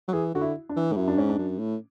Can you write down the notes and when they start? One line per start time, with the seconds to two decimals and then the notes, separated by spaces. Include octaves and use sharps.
0.08 F#3
0.13 E3 G#4
0.34 D3 F#4
0.41 E4
0.69 D4
0.76 E3
0.92 G#2
0.97 F#2 E4
1.08 D4
1.17 G#2 C#4
1.29 D4
1.38 F#2
1.59 A2